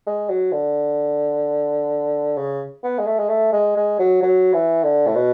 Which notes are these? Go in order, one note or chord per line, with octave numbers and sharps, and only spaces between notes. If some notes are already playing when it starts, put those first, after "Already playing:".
G#3
F#3
D3
C#3
B3
G#3
A3
G#3
A3
G#3
G#3
F#3
F#3
E3
D3
A2
B2